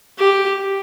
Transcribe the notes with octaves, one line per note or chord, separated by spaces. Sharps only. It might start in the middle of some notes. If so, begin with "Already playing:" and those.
G4